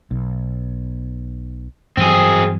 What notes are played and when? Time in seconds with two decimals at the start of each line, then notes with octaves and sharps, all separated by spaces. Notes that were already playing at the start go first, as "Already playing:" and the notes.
0.11 B1
1.97 G2 E3 F#3 C4 G#4